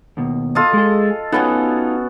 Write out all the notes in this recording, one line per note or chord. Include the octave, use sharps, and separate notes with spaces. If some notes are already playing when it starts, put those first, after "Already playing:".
D#2 B2
F4 A4 D#5
G#3 G#4
B3 C#4 D#4 F4 F#4 A4